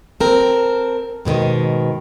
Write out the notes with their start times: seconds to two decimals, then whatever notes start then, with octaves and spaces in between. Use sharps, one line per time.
0.20 C4 A4 A#4
1.25 G#2 B2 D3 D#3